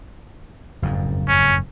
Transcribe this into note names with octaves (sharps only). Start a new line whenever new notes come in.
F#1 F2 G#2
C#4